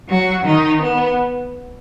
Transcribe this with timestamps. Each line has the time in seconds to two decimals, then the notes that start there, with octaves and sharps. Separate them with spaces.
0.08 F#3 F#4
0.44 D#3 D#4
0.81 B3